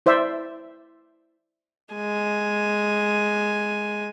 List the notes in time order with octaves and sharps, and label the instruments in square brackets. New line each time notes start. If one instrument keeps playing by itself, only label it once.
[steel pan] E4 C5 D5 E5
[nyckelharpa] G#3 G#5